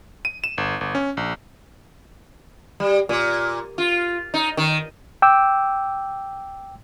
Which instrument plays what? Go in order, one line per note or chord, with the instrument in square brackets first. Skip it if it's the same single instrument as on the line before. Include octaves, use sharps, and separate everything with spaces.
[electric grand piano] D#7
E7
G1
G1
C#4
A#1
[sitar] G3
A#2
F4
D#4
D#3
[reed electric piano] G5 D6 E6